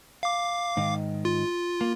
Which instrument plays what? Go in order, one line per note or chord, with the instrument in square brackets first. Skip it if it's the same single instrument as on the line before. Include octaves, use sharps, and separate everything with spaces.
[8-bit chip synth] F5 D6
[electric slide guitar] G#2 D#3
[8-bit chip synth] F4
[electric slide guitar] A#3